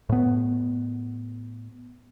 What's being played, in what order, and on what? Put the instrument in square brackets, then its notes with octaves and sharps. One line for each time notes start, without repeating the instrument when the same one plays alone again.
[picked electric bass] A2 B3